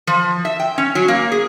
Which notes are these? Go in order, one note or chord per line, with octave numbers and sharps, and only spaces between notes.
F3
E5
G5
C#4
F#3
A#3
G#4